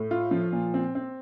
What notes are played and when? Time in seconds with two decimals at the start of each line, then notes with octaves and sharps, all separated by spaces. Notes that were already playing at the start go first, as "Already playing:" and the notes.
Already playing: A2
0.11 F4
0.31 F3
0.52 A#2
0.74 C4
0.95 C4